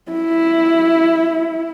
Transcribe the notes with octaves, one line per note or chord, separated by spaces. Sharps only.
E4